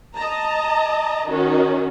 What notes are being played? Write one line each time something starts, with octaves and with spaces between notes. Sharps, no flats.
D#5 A5 A#5
D#3 C#4 F#4